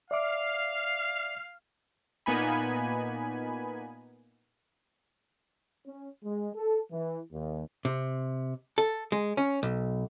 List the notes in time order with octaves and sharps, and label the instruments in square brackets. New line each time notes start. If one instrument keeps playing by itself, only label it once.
[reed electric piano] D5 E5 D6 [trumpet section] F5
[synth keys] A#2 A#3 B3 D#4 G#5 B5
[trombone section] C#4
G#3
A4
E3
D#2
[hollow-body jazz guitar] C3
A4
G#3
C#4
B1